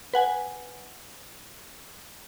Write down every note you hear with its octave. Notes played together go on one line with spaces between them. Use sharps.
B4 F#5 G#5